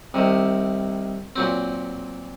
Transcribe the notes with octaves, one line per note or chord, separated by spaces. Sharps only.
C2 C3 D#3
A#2 F#3 C4